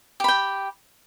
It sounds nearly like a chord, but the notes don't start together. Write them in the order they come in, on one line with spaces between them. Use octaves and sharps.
G4 B5 G5